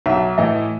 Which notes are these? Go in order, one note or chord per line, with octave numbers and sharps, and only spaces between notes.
B1 E5
A2 E3 D#5